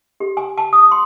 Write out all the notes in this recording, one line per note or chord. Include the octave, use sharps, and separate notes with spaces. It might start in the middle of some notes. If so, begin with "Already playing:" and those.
G4
G#5
A5
D#6
C6